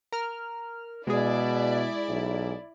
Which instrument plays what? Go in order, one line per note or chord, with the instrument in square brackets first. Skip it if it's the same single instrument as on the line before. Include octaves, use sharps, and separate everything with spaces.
[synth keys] A#4 F6
[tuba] B2 [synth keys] G#3 G#4 [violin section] E4 D5
[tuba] B1